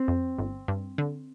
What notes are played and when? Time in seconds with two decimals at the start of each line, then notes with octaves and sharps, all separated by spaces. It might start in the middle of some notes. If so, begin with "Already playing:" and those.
Already playing: C4
0.08 F2
0.39 G1
0.68 G2
0.98 D3